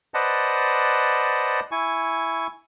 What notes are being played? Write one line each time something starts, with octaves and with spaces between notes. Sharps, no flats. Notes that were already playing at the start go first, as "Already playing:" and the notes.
B4 C5 D5 D#5 F#5 A5
E4 G#5 C#6